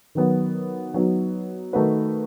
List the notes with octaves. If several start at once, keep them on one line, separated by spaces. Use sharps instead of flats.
D#3 F#3 B3
F#3 B3 D#4 F#4
D#3 A3 D#4 F#4 B4